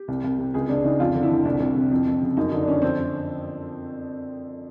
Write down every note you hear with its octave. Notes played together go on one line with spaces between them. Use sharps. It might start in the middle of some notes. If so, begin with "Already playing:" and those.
Already playing: G4
C2
C2
C3
C#2 G#4
C#2 D4
C#3 D#4
F2 F4
D3
E4
D3
C2
C2
C3
F2
F2
C#3
F#2 D#4
D3 D#4
D4
D3 C#4
F2 C4